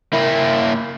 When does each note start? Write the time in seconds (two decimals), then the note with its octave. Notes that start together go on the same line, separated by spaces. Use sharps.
0.14 A#3 E4